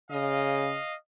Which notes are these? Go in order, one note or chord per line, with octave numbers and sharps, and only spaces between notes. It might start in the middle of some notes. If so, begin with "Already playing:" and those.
C#3 D#5 F5